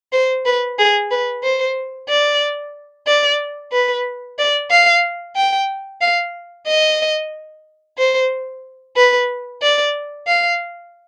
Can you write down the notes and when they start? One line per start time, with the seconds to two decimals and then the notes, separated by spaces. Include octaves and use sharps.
0.12 C5
0.45 B4
0.79 G#4
1.11 B4
1.43 C5
2.09 D5
3.07 D5
3.72 B4
4.39 D5
4.70 F5
5.36 G5
6.01 F5
6.67 D#5
7.98 C5
8.96 B4
9.62 D5
10.27 F5